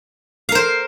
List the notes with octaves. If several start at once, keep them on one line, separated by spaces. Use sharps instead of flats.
A#4 C5 F5